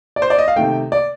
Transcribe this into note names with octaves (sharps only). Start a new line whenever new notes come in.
D5
C5
D5
D#5
F5
C3 D#3 A3 G5
D5